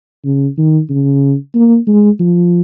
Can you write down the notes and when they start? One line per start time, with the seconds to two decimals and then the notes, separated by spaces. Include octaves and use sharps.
0.25 C#3
0.58 D#3
0.90 C#3
1.55 A#3
1.87 G#3
2.20 F3